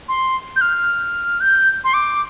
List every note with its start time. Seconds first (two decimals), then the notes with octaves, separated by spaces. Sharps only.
0.09 C6
0.56 G6
0.61 F6
1.41 G6
1.84 C6
1.94 D6